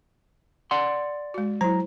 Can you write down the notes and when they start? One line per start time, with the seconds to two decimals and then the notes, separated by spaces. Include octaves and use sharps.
0.71 D5 F#5 C6
1.34 G#3 F#4
1.61 F#3 E4 C5 A#5